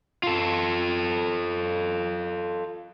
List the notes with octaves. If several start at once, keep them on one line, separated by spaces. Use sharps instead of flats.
F4 A4